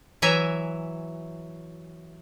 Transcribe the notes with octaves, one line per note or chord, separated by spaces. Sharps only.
E3 F#3 E5 G#5 A#5